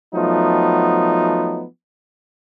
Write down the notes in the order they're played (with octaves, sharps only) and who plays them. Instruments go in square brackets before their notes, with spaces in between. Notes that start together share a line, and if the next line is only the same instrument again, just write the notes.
[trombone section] F3 F#3 A3 B3 D#4